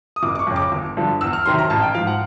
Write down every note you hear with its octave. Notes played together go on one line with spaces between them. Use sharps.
D#6
F#1 D6
D6
C#6
F2 C#3
D6
G1
G2 D3 F3
E2 E6
F6
C3 D#3 F#3 C6
A#5
A1 A5
G5
G#2 F3 F5
F#5